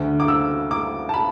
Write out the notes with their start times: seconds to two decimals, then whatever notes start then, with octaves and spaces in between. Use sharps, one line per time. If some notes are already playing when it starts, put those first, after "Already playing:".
Already playing: D2 D3
0.20 D6
0.28 E6
0.71 D6
1.09 A5
1.14 B5